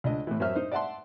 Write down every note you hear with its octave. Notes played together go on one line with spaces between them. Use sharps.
C#2 D4 D#5
A2 E3
F#2 C#4 C5 E5 F6
D#4 C5
D5 E5 F#5 A5 C6